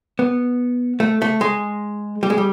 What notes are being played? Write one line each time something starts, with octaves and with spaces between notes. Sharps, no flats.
B3
A3
A3
G#3
G3
G#3
G3